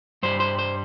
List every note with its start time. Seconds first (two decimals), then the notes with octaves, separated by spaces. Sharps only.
0.23 G2 G3 C5
0.40 C5
0.59 C5